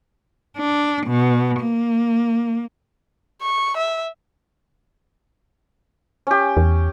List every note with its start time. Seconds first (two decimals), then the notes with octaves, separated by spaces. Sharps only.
0.57 D4
1.07 B2
1.61 A#3
3.42 C#6
3.77 E5
6.27 C#4 G4
6.57 E2